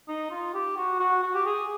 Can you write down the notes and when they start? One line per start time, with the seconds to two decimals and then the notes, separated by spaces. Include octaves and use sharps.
0.08 D#4
0.31 F4
0.54 G4
0.77 F#4
1.00 F#4
1.23 F#4
1.35 G4
1.46 G#4